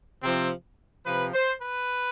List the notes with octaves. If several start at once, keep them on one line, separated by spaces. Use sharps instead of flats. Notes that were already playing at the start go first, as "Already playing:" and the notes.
C3 F3 C4
C3 F3 B4
C5
B4